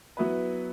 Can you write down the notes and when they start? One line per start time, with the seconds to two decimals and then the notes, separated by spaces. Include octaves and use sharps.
0.17 F#3 B3 E4 B4